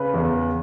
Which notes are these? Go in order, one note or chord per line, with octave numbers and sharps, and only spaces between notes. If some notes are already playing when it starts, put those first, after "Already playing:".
Already playing: C#3 B4
E2